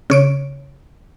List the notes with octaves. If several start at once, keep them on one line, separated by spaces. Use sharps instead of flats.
C#3 C#5 D7